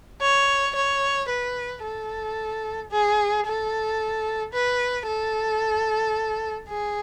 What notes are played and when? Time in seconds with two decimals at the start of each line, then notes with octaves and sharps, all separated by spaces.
0.22 C#5
0.76 C#5
1.29 B4
1.83 A4
2.91 G#4
3.46 A4
4.53 B4
5.07 A4
6.69 G#4